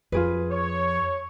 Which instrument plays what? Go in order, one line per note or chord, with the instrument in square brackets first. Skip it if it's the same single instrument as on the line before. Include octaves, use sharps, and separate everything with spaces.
[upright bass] F2 [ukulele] F4 G#4 B4
[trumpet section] C#5